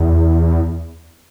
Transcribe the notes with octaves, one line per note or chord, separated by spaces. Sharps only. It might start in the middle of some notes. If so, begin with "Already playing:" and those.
Already playing: E2